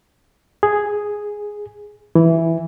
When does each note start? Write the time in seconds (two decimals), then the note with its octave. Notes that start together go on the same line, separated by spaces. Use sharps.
0.63 G#4
2.15 E3